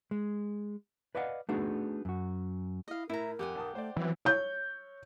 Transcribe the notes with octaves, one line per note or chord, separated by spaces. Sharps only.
G#3
B4 D5 D#5 F5 F#5
A3 B3 D4 D#4 F#4 G#4
F#2 F#4
E4 D#5 F5
A2 E4 A#4 A#5
F2 G4 F#5 G#5
B1 A5 D#6
A3 C5 D5
E3 F#3 B3 C4 E4
C#5 G6